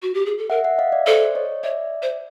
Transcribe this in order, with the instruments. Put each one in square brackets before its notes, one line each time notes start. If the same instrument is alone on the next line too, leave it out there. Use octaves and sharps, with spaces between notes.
[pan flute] F#4
G4
G#4
A4
[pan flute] A#4 [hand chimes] E5 F#5
[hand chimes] E5 F#5
D#5 F5
D5 E5
[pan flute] A4 [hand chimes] C5 D5
[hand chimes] C#5 D#5
[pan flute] C#5 [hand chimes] D5 E5
[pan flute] C5